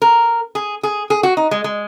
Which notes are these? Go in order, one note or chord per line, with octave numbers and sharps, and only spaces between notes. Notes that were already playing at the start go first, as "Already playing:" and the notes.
A#4
G#4
G#4
G#4
F#4
D#4
G#3
G#3